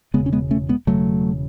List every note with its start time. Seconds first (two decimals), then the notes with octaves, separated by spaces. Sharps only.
0.14 E1 D#2 C#3 G#3 B3
0.26 C#4
0.33 G#3 B3
0.51 A3 C#4
0.69 G#3 B3
0.87 E1 D#2 C#3 F#3 A3